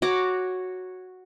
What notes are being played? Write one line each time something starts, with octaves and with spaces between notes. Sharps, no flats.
F#4 C#5 A#5 D6